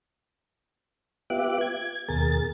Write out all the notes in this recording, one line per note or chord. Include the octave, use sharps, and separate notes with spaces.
B3 F4 G4 E5 D6 F#6
G#6
D#2 B2 G#4 A#4 A6